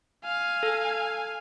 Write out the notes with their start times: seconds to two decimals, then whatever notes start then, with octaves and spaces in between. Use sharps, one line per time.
0.24 F5 G#5
0.63 A4